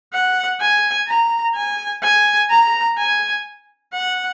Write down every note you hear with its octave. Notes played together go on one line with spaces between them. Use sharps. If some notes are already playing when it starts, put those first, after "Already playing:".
F#5
G#5
A#5
G#5
G#5
A#5
G#5
F#5